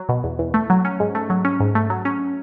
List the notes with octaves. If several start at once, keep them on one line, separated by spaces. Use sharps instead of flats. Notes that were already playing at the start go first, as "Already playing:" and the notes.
Already playing: F#3
B2
E2
E2
A3
F#3
C#4
G#2
A3
F#3
C#4
G#2
A3
F#3
C#4